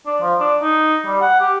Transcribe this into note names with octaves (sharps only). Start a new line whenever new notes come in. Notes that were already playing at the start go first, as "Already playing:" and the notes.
D4
F3
D4
D#4
G3
F#5
G4